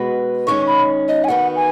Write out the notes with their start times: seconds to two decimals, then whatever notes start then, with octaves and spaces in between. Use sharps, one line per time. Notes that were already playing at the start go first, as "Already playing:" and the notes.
Already playing: B2 G#3 B3 F#4 B4
0.47 D#3 G#3 C#4 C#6
0.67 B5
1.08 D#5
1.24 G#5
1.28 D#3 B3 F#4 F#5
1.56 G#5